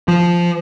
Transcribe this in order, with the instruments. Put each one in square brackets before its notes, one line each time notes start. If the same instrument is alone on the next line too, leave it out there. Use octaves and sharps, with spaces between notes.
[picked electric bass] F3